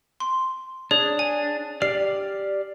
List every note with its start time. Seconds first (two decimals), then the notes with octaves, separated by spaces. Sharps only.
0.20 C6
0.91 D4 G#4 C#5
1.19 G#5
1.82 G4 D5 F6 C7